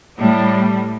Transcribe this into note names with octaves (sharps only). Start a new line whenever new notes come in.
A2 G3